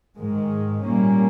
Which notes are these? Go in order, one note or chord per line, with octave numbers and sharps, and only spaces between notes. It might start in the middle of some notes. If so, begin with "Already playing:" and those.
G#2 D#3 G#3
A#2 G3 A#3 C#4